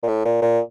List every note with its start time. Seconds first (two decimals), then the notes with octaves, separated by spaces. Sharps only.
0.03 A#2
0.08 A2
0.25 A#2
0.42 A#2